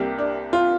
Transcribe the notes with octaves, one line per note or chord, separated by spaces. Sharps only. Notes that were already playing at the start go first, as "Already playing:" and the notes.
Already playing: C2 C3 G3 A#3 G4
D4
F4